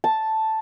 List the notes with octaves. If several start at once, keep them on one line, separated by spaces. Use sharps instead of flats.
A5